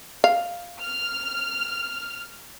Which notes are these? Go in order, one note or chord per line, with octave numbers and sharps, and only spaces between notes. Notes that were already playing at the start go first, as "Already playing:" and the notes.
F5
F6